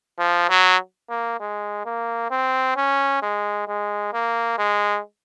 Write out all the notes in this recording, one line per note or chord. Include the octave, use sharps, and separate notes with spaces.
F3
F#3
A#3
G#3
A#3
C4
C#4
G#3
G#3
A#3
G#3